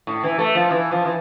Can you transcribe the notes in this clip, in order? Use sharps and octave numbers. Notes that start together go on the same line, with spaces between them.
A2
E3
A3
F3
E3
F3
E3